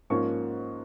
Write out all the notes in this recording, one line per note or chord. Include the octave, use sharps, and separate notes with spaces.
G#2 F3 A#3 C#4 C#6